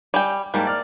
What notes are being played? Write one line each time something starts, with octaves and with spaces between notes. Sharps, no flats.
G3 G5 G#5
G#2 G3 A#3 A5
D5 F6